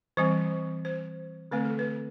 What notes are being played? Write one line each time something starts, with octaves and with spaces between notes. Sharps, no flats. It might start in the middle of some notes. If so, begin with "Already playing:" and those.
E3 G3 C4 C5
C5
D3 A3 C4 B4
A4
B4